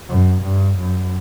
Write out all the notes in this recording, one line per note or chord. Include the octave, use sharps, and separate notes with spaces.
F#2
G2
F#2